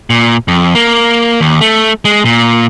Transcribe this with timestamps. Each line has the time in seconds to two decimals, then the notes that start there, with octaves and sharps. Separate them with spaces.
0.10 A#2
0.48 F2
0.75 A#3
1.41 D#2
1.61 A3
2.05 G#3
2.25 A#2